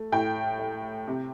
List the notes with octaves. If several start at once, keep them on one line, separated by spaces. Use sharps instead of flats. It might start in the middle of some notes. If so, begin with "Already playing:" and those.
Already playing: A3
A2 G5
A3
C3